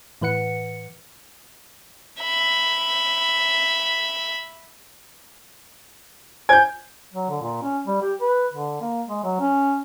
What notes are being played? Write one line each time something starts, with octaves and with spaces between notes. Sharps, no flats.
A2 E3 B4 F#5 C#7
E5 B5
C5 G#5 G6 G#6
F#3
D3
A#2
C#4
G3
G4
B4
D3
A#3
G#3
F#3
C#4